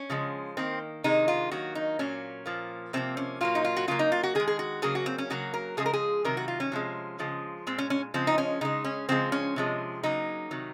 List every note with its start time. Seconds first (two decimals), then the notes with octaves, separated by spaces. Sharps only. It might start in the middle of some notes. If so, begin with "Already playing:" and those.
Already playing: C#4
0.10 C#3 F3 G#3
0.57 D#3 A#3 C4
1.04 C3 D#3 G#3 D#4
1.28 F4
1.51 D#3 F#3 A#3 F#4
1.75 D#4
1.99 A#2 F#3 A#3 C#4
2.46 A#2 F3 A#3
2.93 C3 F3 A#3 C4
3.17 C#4
3.41 A#2 F#3 A#3 F4
3.55 D#4
3.65 F4
3.77 F#4
3.88 C#3 F#3 A#3 F4
3.99 D#4
4.12 F4
4.23 F#4
4.35 D#3 G#4
4.40 G#3
4.47 G#4
4.59 F#4
4.82 C#3 F#3 A#3 G#4
4.95 F#4
5.06 C4
5.18 C#4
5.30 C#3 F#3 A#3 F#4
5.54 A#4
5.77 C#3 F3 G#3 G#4
5.86 A#4
5.93 G#4
6.25 C3 D#3 F#3 A#4
6.37 F#4
6.48 F4
6.60 C#4
6.72 C3 F3 G#3
7.19 C#3 F3 G#3
7.67 A#2 G#3 C4
7.78 C#4
7.90 C#4
8.14 C#3 F3 G#3 C4
8.27 D#4
8.38 C#4
8.61 C#3 G#3 D#4
8.84 C#4
9.09 C#3 F3 G#3 C4
9.32 C#4
9.56 C3 F3 G#3
10.03 C#3 F#3 A#3 D#4
10.51 C3 D#3 F#3